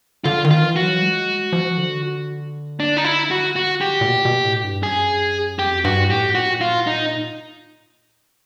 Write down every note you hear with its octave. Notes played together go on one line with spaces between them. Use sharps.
D3 F4
D#3
F4
E3
F#4
F#3
G#3
F3
D3
D4
D#4
E4
F#4
F#4
G4
A#2
B2
A#2
B2
A2
G2
F#2 G#4
F2 G4
G2 F#4
A2 G4
A#2 F#4
F4
D#4